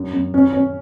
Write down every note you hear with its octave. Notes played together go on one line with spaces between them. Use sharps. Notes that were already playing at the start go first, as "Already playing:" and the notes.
Already playing: F#2
F#2
C#4
C#4